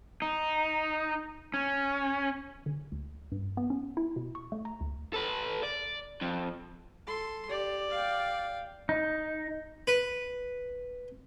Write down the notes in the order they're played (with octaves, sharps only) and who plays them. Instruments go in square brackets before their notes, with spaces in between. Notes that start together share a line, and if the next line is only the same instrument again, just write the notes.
[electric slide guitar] D#4
C#4
[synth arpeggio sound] D3
D2
G2
B3
C#4
E4
B2
C#6
A3
A#5
D2
[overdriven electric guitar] A4 B4
D5
F2
[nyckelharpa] A4 C6
[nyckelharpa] G4 [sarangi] D5
[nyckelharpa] F5 G5
[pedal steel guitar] D#4
[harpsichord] B4